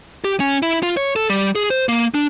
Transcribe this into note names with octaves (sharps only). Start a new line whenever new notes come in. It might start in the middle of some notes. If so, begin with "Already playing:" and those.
G4
C#4
E4
F4
C#5
A4
G3
G#4
C5
A#3
D4